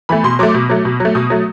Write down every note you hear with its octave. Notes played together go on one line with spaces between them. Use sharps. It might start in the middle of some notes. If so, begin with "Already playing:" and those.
E3 A3 B5
B2 C6
F#3 A3 D6
B2
F#3 A3
B2
F#3
A3
B2 D#6
F#3 A3